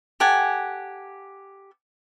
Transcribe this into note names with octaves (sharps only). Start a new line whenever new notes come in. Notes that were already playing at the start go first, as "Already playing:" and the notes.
G4 A4 F#5 G#5